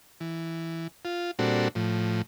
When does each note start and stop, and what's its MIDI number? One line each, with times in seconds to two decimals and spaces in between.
0.20 0.87 52
1.05 1.31 65
1.39 1.68 46
1.39 1.68 55
1.39 1.68 60
1.39 1.68 62
1.39 1.68 66
1.39 1.68 69
1.75 2.22 45
1.75 2.22 53